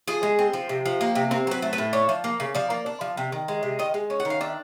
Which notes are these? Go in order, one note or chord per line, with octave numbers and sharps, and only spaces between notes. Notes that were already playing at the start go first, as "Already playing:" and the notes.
F3 G#4
G#3
C4
F3
C3
F3
A#3
C3
C4 A#4
F#3 B4
A3
B4
A2
D4 C#5
F3
A#3
C#3
F3 D5
A#3
D4
F3
C3
D#3
G#3
C3
D#3 D#5
G#3
C#4
F#5
D#3
F5
D4 E5